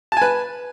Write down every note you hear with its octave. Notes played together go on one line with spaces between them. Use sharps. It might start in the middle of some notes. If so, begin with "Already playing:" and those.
B4 G#5 A5